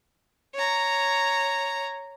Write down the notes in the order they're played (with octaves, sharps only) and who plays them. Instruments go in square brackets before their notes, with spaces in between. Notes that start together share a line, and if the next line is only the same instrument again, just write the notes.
[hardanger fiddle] C#5 A#5